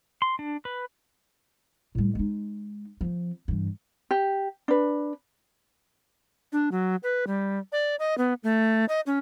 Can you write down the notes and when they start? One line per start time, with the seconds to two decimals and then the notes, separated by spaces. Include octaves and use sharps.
0.22 C6
0.39 D4
0.65 B4
1.95 A2 G3
2.15 G#3 D#4
3.01 F3 C4
3.48 G2 E3
4.11 G4
4.68 D4 B4
6.52 D4
6.72 F#3
7.03 B4
7.27 G3
7.72 D5
7.99 D#5
8.18 B3
8.44 A3
8.89 D#5
9.07 C#4